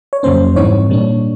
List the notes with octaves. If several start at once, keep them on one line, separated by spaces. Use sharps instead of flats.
C#5
F2 C#3 F#3 A#3 C#4 C5
G#2 E3 G3 C4 D#4 C#5
A#2 G3 A#3 D4